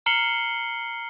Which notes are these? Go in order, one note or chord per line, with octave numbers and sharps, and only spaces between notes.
A#5 F6 C7 C#7 F#7 G7